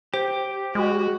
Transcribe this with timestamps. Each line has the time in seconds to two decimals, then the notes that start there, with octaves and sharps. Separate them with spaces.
0.14 G4 C5
0.75 G#3 F#4